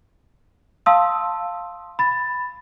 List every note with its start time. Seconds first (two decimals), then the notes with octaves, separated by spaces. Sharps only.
0.86 F5 A5 C6 D#6 E6
1.99 B5 A6